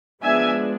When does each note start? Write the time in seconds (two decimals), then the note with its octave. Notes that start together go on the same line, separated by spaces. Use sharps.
0.22 F3 G#3 B3 D4 E5 G#5